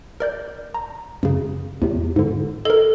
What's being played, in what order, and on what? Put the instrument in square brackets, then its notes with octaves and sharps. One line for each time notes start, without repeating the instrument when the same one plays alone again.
[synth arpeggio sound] A#4 D5 G6
A#5
F#2 C#3
E2 A2 C3
G#2 D3
[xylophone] A4 [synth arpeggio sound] A#4 D#5